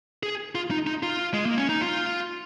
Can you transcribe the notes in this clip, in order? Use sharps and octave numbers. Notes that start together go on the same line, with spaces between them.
G#4
F4
D#4
D#4
F4
G#3
A#3
C#4
D#4
F4